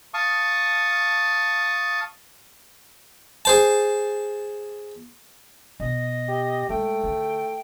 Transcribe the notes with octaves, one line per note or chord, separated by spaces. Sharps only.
F5 A5 C#6 D#6
G#4 C5 A5
B2 D#5
G4
G#3 A3 G5
D3